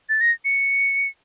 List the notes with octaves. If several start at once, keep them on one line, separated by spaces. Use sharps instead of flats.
A6
A#6
C#7